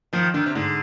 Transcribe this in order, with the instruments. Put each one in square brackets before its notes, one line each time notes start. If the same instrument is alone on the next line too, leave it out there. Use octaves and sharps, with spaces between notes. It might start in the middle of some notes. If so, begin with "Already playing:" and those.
[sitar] D#3 [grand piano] F3
[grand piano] D3 [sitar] D#3
[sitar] C3
[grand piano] G#2 [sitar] D3